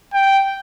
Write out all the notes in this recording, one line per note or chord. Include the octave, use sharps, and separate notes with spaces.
G5